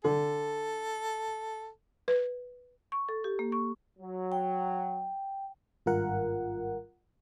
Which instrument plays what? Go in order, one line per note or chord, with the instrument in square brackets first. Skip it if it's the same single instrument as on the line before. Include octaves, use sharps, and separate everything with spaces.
[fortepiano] D3 [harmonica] A4
[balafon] B4
[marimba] C#6
A4
G4
A#3
C#6
[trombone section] F#3
[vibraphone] G5
[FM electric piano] G#1 G2 F4 A#4 F#5